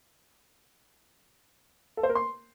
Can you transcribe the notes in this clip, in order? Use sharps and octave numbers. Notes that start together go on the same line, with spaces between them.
A4
C5
A#4
C6